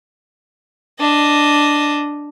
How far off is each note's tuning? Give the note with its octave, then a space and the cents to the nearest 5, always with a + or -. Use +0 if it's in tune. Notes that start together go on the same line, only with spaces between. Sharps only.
D4 +0 D#5 +0